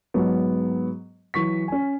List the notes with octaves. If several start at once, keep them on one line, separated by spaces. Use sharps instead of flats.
G#2 F#3 B3
E3 F#3 C#6 B6
C#4 G#5